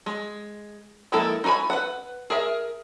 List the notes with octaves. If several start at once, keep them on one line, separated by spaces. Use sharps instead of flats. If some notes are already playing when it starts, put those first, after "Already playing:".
G#3
F3 G#3 A#3 E4 A4
D#4 F#4 A4 G#5 B5
B4 F#5
G#4 A#4 E5